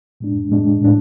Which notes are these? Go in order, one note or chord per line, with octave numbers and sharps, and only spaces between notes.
A2 G#3 D4
A2 G#3 D4
A2 G#3 D4